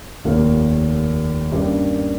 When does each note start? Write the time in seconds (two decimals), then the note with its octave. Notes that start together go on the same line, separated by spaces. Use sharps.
0.24 F1 D#2 D#3 A#3
1.52 G2 G3 A#3 C#4